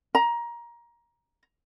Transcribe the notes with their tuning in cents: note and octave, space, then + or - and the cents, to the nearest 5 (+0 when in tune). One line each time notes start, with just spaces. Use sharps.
A#5 +20